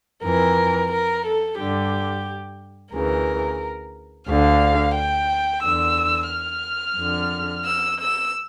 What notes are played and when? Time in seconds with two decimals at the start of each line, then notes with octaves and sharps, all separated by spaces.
0.24 F2 E3 A#4
0.92 A#4
1.25 A4
1.59 G2 D3 G4
2.93 D2 C#3 E3 A#4
4.28 D2 D3 F5
4.95 G5
5.63 E2 D3 E6
6.30 F6
6.98 F2 D3
7.65 E6
7.99 E6